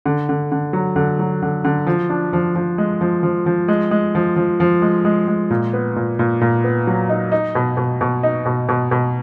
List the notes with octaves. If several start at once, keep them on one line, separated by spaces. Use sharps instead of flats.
D3
D3
D3
F#3
D3
F#3
D3
D3
F3
D4
F3
F3
G#3
F3
F3
F3
G#3
G#3
F3
F3
F3
G#3
G#3
G#3
A#2
B3
A#2
A#2
A#2
B3
F#3
D#4
D#4
B2
B2
B2
D#4
B2
B2
B2